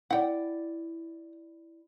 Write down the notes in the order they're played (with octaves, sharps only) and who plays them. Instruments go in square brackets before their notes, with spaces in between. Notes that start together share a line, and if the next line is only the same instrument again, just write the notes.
[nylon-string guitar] E4 D5 [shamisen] F#5 G5